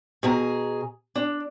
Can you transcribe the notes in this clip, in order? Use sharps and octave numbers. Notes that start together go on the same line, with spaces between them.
B2 G#4 G#5 A#5
D4